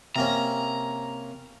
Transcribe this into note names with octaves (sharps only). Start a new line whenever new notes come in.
C3 A#3 C#4 A#5